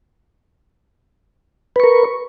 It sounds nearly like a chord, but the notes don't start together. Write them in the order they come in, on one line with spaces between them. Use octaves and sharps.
B4 C#6 A#4